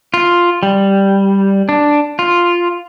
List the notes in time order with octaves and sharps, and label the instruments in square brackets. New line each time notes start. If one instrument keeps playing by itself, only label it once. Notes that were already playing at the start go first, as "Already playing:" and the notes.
[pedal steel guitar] F4
G3
D4
F4